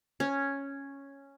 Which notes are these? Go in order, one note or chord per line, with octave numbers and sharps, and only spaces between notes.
C#4